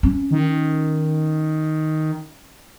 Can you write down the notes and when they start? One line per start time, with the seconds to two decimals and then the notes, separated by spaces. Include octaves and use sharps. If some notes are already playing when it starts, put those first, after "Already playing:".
0.03 C#4
0.31 D#3